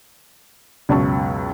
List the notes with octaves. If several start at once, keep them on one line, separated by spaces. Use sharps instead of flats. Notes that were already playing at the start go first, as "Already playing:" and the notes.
C#2 F#2 B2 A5 C#6